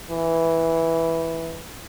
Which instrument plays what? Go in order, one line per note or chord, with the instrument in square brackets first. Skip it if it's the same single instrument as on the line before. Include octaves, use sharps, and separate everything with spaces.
[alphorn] E3